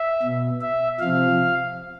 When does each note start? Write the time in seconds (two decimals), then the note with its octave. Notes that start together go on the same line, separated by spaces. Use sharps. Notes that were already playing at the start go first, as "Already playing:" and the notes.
Already playing: E5
0.22 B2
0.61 E5
1.00 C3 F3 F5